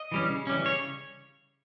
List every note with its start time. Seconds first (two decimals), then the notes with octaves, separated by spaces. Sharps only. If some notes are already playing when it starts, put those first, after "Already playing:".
Already playing: D#5
0.12 E3 G3 C#4
0.30 C#3
0.47 E3 G3 C#4
0.65 C#3 C#5